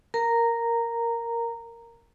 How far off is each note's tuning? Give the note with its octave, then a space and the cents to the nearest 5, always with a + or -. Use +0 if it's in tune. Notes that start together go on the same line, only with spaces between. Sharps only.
A#4 +0 A#5 -10